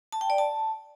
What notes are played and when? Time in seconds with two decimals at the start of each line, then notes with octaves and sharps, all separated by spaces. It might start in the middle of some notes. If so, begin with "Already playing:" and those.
0.12 A5
0.21 G5
0.30 D5
0.38 A5